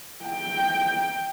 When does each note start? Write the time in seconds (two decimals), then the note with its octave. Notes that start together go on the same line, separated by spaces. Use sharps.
0.25 G5